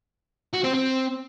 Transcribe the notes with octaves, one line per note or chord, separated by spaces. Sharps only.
F#4
C4
C4